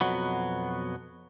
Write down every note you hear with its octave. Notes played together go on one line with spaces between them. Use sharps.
F2 B2 F#3 B3